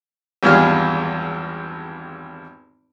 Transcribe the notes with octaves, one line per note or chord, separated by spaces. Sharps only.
G#1 E2 G2 G#3 F4 F6